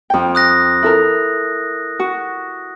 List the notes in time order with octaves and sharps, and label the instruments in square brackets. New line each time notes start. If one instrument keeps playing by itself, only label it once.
[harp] F2 G5
[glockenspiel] D#6 F#6 A#6
[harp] E4 A4 A#4
F#4